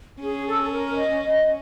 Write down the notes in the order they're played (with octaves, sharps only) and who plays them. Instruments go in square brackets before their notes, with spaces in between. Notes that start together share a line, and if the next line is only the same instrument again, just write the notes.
[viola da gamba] C#4 [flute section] G#4
[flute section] A4
A4
A#4
D#5
D#5